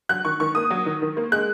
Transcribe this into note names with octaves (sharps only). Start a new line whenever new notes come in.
F#3 F#6
D#3 C#6
D#3 C#6
A#3 D#6
F#3
D#3
D#3
A#3
G#3 F#6